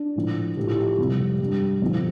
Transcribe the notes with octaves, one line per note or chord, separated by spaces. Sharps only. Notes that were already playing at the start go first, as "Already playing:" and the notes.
Already playing: D4
A2 F3
A2 F3 G4
F4
G4
F2 C3 G3
G2 G3
F2 F3